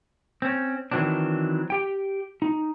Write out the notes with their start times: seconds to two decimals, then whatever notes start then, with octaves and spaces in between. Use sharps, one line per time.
0.42 C4 C#4
0.91 D#3 E3 F#3 C4 D4
1.70 G4 G5
2.42 D#4